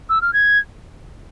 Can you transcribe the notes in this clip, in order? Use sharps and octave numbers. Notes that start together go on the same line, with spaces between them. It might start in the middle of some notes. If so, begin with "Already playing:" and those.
E6
F6
G#6